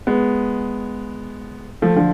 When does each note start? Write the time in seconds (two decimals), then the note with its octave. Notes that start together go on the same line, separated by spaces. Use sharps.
0.07 G#3 B3
1.82 F3 A3
1.96 D3 F3